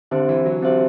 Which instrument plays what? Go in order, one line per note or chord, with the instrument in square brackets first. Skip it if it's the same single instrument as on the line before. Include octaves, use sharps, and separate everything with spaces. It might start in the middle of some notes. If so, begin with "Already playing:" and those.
[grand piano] D3 [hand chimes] C4 G4 C5 E5
[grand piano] E3
F#3
[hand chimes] C4 G4 C5 E5